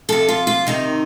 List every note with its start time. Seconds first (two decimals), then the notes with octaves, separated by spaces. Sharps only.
0.09 C3 F3 A4
0.29 F4
0.47 F4
0.67 C3 D#3 D#4